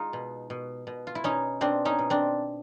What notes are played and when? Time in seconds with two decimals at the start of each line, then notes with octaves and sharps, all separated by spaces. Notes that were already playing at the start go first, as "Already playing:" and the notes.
Already playing: G#3 D#4 F4
0.13 B2
0.50 B2
0.87 B2
1.07 F4
1.15 E4
1.24 B2 C#4 D#4
1.61 B2 C4 D4
1.85 C#4 D#4
1.99 B2
2.10 C4 D4